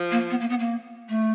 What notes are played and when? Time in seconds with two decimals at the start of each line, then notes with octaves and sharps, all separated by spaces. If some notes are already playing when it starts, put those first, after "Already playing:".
Already playing: F3
0.11 A#3
0.30 B3
0.40 A#3
0.50 B3
0.60 A#3
1.09 A3